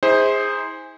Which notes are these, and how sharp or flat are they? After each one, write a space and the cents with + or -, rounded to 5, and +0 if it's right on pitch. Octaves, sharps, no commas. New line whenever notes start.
E4 -45 G#4 -15 C5 +0